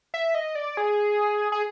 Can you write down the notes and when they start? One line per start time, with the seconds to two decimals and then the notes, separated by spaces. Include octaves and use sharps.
0.14 E5
0.35 D#5
0.55 D5
0.77 G#4
1.52 G#4